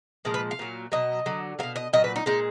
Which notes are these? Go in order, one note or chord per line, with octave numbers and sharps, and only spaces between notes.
A#2 F3 G#3 A#4
B4
F5
A#2 F#3
B2 F#3 D#5
D3 F#3
B2 F#3 F5
D#5
A#2 F#3 D#5
B4
D#4
A#2 G#3 D#4